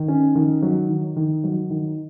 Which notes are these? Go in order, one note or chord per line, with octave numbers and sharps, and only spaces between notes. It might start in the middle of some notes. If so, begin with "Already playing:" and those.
Already playing: D#3
C#4
D#3
F#3
D#3
D#3
F#3
D#3